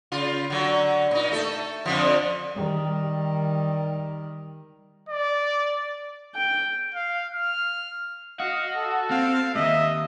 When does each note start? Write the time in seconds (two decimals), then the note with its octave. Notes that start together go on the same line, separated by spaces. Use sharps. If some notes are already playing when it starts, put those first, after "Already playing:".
0.12 C#3 F4
0.50 D3 F#3
1.11 A#2 D#4
1.31 A3 A4
1.85 F2 D3 F3
2.56 D#3 G3
5.09 D5
6.35 G5
6.94 F5
7.32 F6
8.40 F#4 D#5 F5
8.77 A4
9.10 C4 F5
9.55 D#2 G#2 D#5 E5